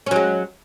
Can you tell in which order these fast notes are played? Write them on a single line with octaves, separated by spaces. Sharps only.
C#4 F#3 G#3